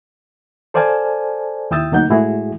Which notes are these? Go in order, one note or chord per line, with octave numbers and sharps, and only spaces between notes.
A4 C5 D5 F5 G#5 A5
D#2 E4 G5 D#6 E6 A6
D2 F#3 A#3 D#4 F#5 G6
A2 G#3 E4 F#4 G#4